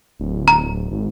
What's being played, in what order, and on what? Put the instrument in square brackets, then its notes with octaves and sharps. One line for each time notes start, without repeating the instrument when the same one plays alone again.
[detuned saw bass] D1
[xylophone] A#5
[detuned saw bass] G#1